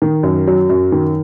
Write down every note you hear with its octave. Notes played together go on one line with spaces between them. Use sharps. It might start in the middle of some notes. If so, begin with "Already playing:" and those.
D#3
F#2
F#3
F#2
D#3